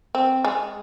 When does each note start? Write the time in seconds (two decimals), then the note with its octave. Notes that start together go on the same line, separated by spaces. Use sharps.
0.15 C4
0.45 G#3